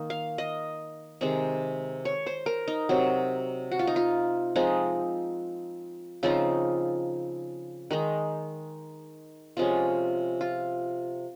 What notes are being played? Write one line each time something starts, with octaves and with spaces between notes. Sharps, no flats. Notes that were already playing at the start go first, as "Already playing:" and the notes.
Already playing: D#3 A#3 D#4
F5
D#5
C3 D#3 G#3 C4
C#5
C5
A#4
D#4
C3 F#3 C4
F#4
F4
D#4
F4
F3 G#3 C4 D#4
C#3 F3 C4 D#4 F4
D#3 G#3 D#4
C3 F3 G#3 C#4 F4
F4